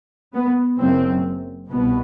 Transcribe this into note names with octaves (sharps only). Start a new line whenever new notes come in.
B3
F#1 F#2 C4
C2 B2 B3